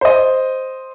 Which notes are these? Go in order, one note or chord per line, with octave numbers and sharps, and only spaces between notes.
C5 D#5